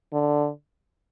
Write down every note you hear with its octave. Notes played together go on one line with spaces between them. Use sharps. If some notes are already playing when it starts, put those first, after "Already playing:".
D3